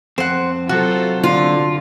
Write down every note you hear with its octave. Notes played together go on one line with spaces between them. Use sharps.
F2 C4 C5 F#5
C3 F#3 F4 F#4 A4 C5
D3 F4